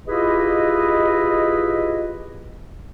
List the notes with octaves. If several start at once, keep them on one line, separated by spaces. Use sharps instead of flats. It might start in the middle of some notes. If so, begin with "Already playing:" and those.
E4 F4 G4 G#4 B4 D#5